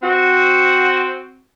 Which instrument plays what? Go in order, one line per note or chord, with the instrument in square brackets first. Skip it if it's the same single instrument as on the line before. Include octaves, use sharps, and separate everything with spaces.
[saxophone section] C4 F#4